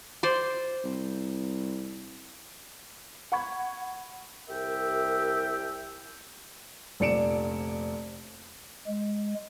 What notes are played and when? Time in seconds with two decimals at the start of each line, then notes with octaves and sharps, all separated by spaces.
0.23 C5 D5 C6
0.84 C2
3.32 F#5 B5 C#6 G#6
4.48 C2 G4 A#4 E5 G5
7.00 F1 A#1 D5 C#7 D7 E7
8.87 G#3